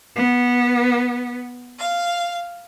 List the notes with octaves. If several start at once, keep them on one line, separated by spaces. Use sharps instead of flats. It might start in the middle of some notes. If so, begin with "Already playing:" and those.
B3
F5